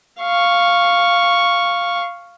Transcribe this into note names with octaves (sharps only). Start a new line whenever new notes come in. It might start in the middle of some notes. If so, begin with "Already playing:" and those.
F5 C#6